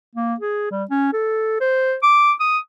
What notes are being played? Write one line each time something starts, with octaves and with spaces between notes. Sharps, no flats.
A#3
G#4
G3
C#4
A4
C5
D6
D#6